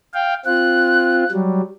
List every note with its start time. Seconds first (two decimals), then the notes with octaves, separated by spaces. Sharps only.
0.14 F5 G5
0.46 C4 F4 F#6
1.31 F#3 G3